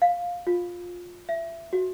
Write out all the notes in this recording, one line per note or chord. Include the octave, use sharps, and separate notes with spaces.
F5
F4
E5
F#4